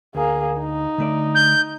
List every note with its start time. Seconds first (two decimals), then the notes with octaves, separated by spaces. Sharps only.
0.15 D2 A#3 G#4
0.61 D#4
0.98 D3 A3 D5
1.35 G6